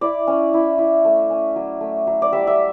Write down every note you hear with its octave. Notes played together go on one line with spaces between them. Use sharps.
E4 D5
C#4
E4
E4
A3
C#4
F#3
A3
F#3
D5
G3 E5
E5